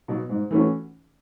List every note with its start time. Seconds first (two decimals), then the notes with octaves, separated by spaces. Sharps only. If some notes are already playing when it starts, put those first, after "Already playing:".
0.08 B2 F#3
0.29 G#2
0.51 E3 A3 C#4 F#4